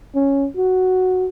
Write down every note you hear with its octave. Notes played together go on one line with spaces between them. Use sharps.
C#4
F#4